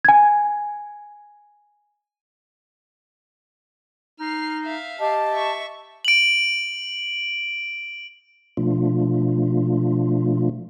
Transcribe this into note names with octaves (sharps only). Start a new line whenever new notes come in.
G#5 G#6
D#4 F6 C7
E5 F5
G4 D#5 A5
E5 C#6
D7 F#7
B2 F3 A3 D4 F4